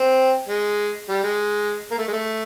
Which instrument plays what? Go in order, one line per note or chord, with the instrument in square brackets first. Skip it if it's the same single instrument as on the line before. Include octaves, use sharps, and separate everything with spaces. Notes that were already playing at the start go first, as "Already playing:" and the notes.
Already playing: [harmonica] C4
G#3
G3
G#3
A#3
A3
G#3
A3